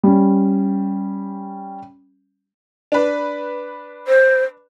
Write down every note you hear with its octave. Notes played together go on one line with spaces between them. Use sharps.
G3 C#4
D4 B4
C5